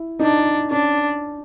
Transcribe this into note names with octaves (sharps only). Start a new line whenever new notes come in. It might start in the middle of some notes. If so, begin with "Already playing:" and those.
Already playing: E4
D4 D#4
C#4 D4